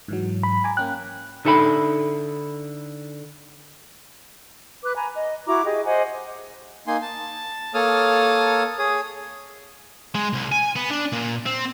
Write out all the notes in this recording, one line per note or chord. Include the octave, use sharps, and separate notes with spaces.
G#2 E3 F#3
B5
G#5 A#5 D6
A#3 C#4 G5 F#6
D3 D#4 A4 E5 G5 B5
B4 D6 F#6
G#5 A#5 B5
D#5
E4 F#4 A#5 D6
G4 G#4 D#5
C5 D#5 F#5 G#5
A#3 D#4 G#5 C6
A5
A#3 A4 C#5 A5 D#6 F6
G#4 C#5 D#6
G#3
C2
G#5
B3
D4
A#2
C4